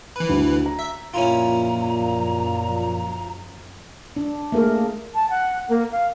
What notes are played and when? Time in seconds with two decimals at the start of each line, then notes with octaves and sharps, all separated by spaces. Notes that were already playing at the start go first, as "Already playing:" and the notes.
0.16 E3 B4
0.29 D2
0.66 A#5
0.79 E5
1.14 F#2 A#2 F3 C#4 E4 F4 A#5
4.17 D4
4.52 A3 A#3 G#4 A#4
5.15 A5
5.30 F#5
5.69 A#3
5.92 F5